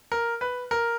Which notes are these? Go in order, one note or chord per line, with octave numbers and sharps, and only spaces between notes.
A#4
B4
A#4